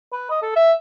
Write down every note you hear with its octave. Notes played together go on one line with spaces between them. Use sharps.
B4
D#5
A4
E5